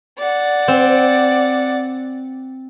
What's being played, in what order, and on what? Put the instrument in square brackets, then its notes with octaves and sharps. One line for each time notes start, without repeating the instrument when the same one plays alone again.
[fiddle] D5 F#5
[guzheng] C4